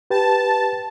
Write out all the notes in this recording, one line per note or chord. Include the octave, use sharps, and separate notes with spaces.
G4 B4 G5 A5